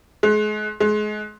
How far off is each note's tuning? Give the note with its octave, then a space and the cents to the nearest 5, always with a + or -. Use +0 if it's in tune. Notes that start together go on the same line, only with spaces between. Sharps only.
G#3 +35
G#3 +30